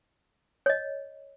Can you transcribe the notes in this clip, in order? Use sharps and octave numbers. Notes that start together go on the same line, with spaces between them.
C#5 D#5